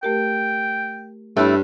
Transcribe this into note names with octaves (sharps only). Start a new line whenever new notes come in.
A3 G4 A#4 G5
G2 A3 E4 G4 C#5